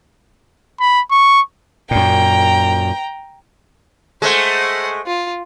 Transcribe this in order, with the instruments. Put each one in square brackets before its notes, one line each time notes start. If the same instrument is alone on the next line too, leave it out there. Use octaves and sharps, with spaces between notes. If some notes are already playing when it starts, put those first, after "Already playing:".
[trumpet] B5
C#6
[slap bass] F#2 A#2 [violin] G5 A#5
[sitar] G#3 A3 [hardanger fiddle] C5 F#5
[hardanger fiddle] F4